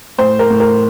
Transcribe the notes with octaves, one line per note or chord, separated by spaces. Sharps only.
A2 C5
A#4
A2
A#4